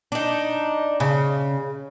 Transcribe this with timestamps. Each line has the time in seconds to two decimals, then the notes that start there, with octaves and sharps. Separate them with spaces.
0.12 D4 D#4
1.00 C#3